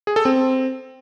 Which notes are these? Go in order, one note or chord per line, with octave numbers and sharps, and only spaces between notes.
G#4
A4
C4